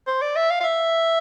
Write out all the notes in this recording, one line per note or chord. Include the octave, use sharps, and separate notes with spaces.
C5
D5
E5
F5
F5
E5